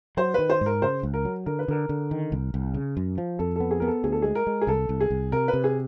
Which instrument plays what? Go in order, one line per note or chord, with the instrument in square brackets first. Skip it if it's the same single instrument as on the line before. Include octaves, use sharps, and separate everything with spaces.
[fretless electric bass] F#3 [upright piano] C5
[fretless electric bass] D#3 [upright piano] B4
[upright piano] C5
[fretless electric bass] G#2 [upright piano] A#4
[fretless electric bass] C#3 [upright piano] C5
[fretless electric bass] C#2
[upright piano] A#4
[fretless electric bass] F#3
[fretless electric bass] D3 [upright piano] A#4
[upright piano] B4
[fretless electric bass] D3 [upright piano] A#4
[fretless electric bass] D3
D#3
C2
C2
C#3
F#2
F3
[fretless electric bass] F2 [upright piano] A4
[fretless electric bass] B3 [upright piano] A4
[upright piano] G#4
[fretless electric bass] B3 [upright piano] A#4
[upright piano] A4
[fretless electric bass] D2 [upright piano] G#4
[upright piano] A4
[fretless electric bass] G#3 [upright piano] G#4
[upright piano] A#4
[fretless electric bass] G#3
[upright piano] G#4
[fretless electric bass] C2 [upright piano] A4
[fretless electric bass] C2
[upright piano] G#4
[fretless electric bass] C2
[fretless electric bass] C3 [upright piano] A#4
[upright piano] B4
[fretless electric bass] C3
[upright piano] G#4